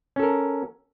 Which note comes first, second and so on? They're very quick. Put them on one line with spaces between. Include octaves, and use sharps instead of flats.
C#4 A4 A#4